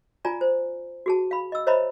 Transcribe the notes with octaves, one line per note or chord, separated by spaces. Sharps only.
F4 D5 G#5 A#5
C5
F#4 G#4 A5
F5 B5
D#5 E6
C5 C#5 D#5 E5 A#5 B5